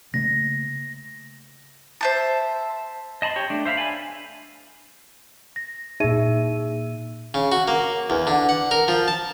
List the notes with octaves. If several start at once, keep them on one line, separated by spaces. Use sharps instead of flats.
C#3 A3 A#3 A#6
C5 E5 A5
D#5 A5 B5 C6
G4 C#5
A3 D4
C5 E5 F5 B5
G#5 A5 B5
A#6
A#2 D#4 G#4 E5 D#7
C#3
F#4
A#3
E2
D3
F#5
A#4
F3
A5